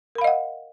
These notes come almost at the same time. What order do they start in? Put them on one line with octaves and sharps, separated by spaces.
A#4 B5 F5 D#5 F#5